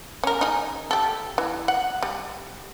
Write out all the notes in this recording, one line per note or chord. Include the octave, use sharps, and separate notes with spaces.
C#4 A#4
D#4 G#4
G4 A4
E3
F#5
G3